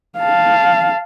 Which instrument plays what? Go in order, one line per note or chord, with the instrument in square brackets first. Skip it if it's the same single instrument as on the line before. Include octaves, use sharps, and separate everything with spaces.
[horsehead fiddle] F5 A5